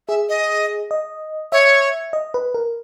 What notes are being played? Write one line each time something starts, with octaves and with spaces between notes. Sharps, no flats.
G#4 E5
D#5
D#5
C#5 E5
D#5
B4
A#4